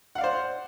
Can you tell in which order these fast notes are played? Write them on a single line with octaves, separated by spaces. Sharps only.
F#5 F5 D5 C5